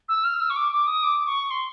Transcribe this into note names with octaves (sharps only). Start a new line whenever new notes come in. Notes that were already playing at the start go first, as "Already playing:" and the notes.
E6
F6
E6
C#6
D6
D6
D#6
D6
C#6
C6